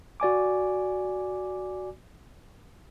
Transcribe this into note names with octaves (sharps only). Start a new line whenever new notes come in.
F#4 D5 G#5 D6